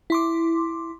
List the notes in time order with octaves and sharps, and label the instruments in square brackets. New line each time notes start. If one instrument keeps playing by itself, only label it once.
[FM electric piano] E4 C6 D6